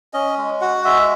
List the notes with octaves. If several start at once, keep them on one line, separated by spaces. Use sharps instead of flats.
C#4 D#5
G#3
F#4 F#5
G#3 E5